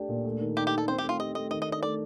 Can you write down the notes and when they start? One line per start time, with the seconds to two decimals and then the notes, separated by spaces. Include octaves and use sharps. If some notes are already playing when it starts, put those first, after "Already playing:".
Already playing: A3 D4 G4
0.09 A#2
0.25 A3
0.40 D#3
0.57 D#4 G4
0.67 G4
0.72 D#3
0.78 A4
0.88 C4 C5
0.98 G4
1.03 A3
1.09 F4
1.19 G4 D#5
1.35 A3 D#5
1.51 D#3 D#5
1.62 D#5
1.67 D4
1.72 D#5
1.83 A3 D5